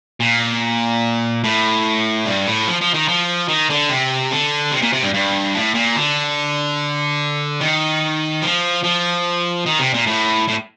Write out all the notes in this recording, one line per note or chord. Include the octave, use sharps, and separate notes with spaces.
A#2
A2
G2
A2
F3
F3
D#3
F3
D#3
D3
C3
D3
C3
A#2
C3
G2
G2
A2
A#2
D3
D#3
F3
F3
D#3
C3
A#2
A2
A2